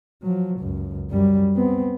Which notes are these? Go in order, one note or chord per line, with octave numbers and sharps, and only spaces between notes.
F3 F#3
C#2 F#2
F#2 G3
B3 C4